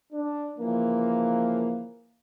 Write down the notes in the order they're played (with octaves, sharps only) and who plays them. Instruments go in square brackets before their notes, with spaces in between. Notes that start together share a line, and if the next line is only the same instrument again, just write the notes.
[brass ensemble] D4
C#3 E3 F3 A#3